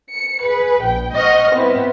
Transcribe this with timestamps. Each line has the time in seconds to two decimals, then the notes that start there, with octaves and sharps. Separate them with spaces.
0.13 C#7
0.45 G#4 B4
0.82 A#1 G5
1.15 C5 D#5 F#5 C#6 F6
1.55 B3 C4 E4 B4